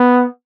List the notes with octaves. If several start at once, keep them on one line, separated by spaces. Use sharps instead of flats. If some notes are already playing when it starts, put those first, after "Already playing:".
Already playing: B3